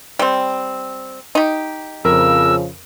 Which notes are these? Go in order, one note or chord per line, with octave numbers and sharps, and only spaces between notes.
G3 C4
D#4 G4
F2 C#3 F3 A#4 E6